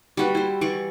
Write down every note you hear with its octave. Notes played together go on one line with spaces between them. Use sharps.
G3 F#4 B4
E4 C5
E3 D5 C#6